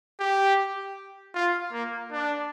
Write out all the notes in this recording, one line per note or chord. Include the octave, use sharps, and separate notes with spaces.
G4
F4
A#3
D4